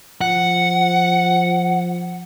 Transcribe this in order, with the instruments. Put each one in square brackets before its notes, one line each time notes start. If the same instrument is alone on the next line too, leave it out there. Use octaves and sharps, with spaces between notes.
[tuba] F3 [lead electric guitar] F#5